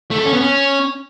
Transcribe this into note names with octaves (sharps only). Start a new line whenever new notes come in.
A3
A4
C#4
B3
C#4